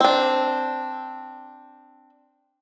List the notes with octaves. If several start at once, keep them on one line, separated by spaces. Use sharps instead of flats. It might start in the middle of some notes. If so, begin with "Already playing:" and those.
C4 D4